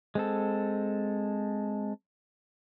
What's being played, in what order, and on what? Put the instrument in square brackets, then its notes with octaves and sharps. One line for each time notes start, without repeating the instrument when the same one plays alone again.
[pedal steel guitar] G#3 C4 A4